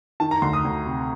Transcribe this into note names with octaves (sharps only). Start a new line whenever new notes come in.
D#3 A5
A#5
D2 C6
D#6
D2
C3